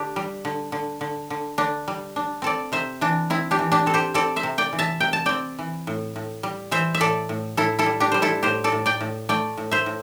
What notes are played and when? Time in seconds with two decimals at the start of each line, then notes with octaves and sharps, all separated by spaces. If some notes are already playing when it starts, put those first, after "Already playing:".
Already playing: D3 D4 G4
0.16 G3
0.45 D3
0.72 D3
1.01 D3
1.30 D3
1.58 D3 D4
1.88 G3
2.16 D4
2.42 C4 A4 D5
2.72 C3 C5 E5
3.01 E3 D4
3.30 C4 E4
3.51 D4 G4
3.59 E3
3.72 D4 G4
3.86 C4 A4
3.94 G4 C5
4.14 C4 A4 D5
4.36 C5 E5
4.43 C3
4.58 D5 G5
4.73 E3
4.79 E5 A5
5.00 C3 G5
5.13 A5
5.26 C4 D5 G5
5.59 E3
5.87 A2
6.16 A2
6.43 G3
6.71 E3 C5 E5
6.95 E5
7.00 A2 A4 D5
7.29 A2
7.57 A2 E4 A4
7.79 E4 A4
7.86 G3
8.00 D4 G4
8.12 G3 C5
8.22 E4 A4
8.43 A2 G4 C5
8.64 A4 D5
8.72 A2
8.86 D5 G5
9.01 A2
9.29 A3 D5 G5
9.57 A2
9.71 C5 E5
9.86 A2